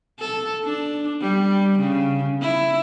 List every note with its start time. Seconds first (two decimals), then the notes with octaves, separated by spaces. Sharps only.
0.19 A4
0.64 D4
1.21 G3
1.80 C#3
2.42 E4